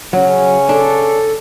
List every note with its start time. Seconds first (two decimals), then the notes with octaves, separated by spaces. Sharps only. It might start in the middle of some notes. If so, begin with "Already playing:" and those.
0.13 C#3 F#3 C#4
0.69 D4 A4